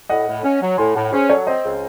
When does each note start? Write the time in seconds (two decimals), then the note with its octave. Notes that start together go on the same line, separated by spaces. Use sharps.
0.09 A2 D#5 F#5
0.27 A2
0.44 C#4
0.61 F#3
0.78 A2 G#5 C6
0.95 A2 F#5 A5
1.12 C#4 G#4 C5
1.29 F#3 A4 C#5
1.47 C4 C5 D#5
1.64 C#2